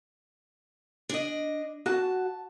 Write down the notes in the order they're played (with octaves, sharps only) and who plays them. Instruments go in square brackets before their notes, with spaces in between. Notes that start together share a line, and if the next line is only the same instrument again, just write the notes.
[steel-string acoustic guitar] D4 D#5
[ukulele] F#4 [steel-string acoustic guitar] A5